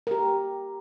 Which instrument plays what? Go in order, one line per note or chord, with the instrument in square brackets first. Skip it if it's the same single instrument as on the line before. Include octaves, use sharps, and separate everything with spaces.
[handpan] G4 A#4